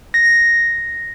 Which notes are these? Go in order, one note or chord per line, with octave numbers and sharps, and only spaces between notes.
A#6